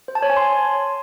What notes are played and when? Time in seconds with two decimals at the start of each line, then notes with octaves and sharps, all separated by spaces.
0.08 C5
0.15 A5
0.22 C#5
0.30 G#5
0.37 C6